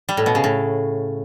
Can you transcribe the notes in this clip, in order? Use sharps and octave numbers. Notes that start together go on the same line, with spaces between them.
G3
A2
B2
C#3
A2